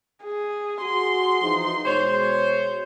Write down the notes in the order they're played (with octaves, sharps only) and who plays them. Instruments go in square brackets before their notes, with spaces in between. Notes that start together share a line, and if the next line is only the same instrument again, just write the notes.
[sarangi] G#4
[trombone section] F#4 G#4 [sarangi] C6
[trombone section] E3 F3 D#4
[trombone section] B2 G#3 [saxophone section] C5 C#5